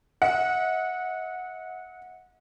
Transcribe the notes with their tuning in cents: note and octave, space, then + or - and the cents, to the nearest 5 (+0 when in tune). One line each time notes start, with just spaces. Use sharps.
D#5 +45 F#5 -20